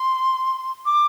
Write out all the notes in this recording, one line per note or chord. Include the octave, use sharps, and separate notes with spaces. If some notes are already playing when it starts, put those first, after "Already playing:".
Already playing: C6
D6